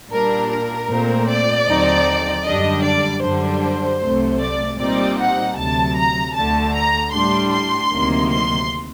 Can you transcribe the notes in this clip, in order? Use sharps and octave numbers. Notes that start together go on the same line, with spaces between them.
A#2 G3 D4 A#4
A#4
A#2 A3 C4
D5
D#2 D3 F#3 C4 D#4
F#2 D3 G3 D4 D#5
D5
F#2 D3 G3 D4 C5
C2 C3 F#3 A3
D5
A#2 G3 C4 D#4 D5
F#5
D2 C3 F#3 A5
A#5
D2 D3 A3 A5
A#5
A2 G3 D4 C6
C6
D2 C3 D#3 F#3 A#3
C6